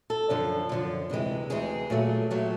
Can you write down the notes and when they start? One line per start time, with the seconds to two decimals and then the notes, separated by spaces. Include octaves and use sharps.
0.10 A4
0.29 F#2 D3 F3
0.69 F#2 D3 F3
1.10 D2 C3 E3 G#3
1.50 D2 C3 E3 G#3 G#4
1.90 A#2 F#3 A3
2.30 A#2 F#3 A3 G4